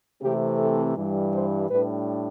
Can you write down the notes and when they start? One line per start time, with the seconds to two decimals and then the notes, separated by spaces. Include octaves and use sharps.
0.20 C3 E3 A3 C4 G4
0.58 A4
0.95 G2 E3 G3
1.33 C5
1.70 A2 G3 D4 B4